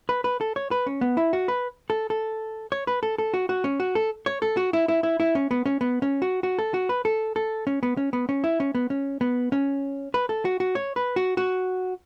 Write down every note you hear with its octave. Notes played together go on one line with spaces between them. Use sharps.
B4
B4
A4
C#5
B4
C#4
B3
E4
F#4
B4
A4
A4
C#5
B4
A4
A4
F#4
F#4
C#4
F#4
A4
C#5
A4
F#4
E4
E4
E4
E4
C#4
B3
C#4
B3
C#4
F#4
F#4
A4
F#4
B4
A4
A4
C#4
B3
C#4
B3
C#4
E4
C#4
B3
C#4
B3
C#4
B4
A4
F#4
F#4
C#5
B4
F#4
F#4